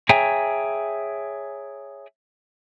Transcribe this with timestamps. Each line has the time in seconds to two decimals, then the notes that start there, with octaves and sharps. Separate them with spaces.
0.09 G#4 C#5 E5 G5 G#5 A#5